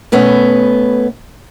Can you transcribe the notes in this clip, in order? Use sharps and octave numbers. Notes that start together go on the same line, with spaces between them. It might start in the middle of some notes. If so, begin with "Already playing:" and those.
B2 A3 B3 C#4